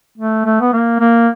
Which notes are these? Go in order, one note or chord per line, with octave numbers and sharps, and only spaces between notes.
A3
A3
B3
A#3
A#3